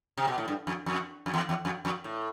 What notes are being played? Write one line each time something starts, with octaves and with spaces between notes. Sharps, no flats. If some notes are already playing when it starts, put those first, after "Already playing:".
C3
B2
A2
G2
F2
F2
F2
E2
E2
F2
F2
A2